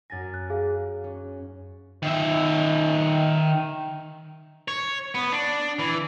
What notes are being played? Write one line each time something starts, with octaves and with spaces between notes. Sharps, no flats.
F#2 G#5 A6 A#6
F#6
G#4 F5
C#4
D#3 E5
C#5
B3
D4
E3